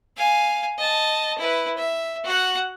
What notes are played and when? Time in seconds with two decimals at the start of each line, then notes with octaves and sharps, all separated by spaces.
0.17 F5 G#5
0.78 D#5 A5
1.38 E4 B4
1.77 E5
2.24 F#4 F#5